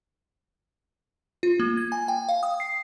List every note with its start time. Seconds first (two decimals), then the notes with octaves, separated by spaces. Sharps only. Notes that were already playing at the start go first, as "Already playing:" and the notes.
1.43 F4
1.60 A#3
1.77 G#6
1.92 G#5
2.08 G5
2.29 F5
2.43 D#6
2.60 C7